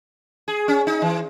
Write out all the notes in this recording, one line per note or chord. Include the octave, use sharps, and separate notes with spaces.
G#4
C#4
D#4
E3